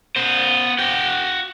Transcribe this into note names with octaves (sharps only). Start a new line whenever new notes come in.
B3 C5
F#4 G5